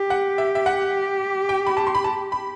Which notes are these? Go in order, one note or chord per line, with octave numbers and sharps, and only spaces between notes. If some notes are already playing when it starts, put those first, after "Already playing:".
Already playing: G4
F#5
E5
E5
F#5
G5
B5
A5
C6
B5
A5
B5